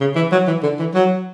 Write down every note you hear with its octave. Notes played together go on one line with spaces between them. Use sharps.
C#3
E3
F#3
E3
D3
E3
F#3